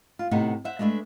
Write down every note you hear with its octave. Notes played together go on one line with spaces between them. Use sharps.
F4
A2 C3 B3 D#4 F#5
C5 E5 F#5
G#3 A3 D4 B4 E5